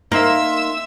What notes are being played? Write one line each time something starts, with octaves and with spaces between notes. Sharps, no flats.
A#3 D#4 E5 C6 E6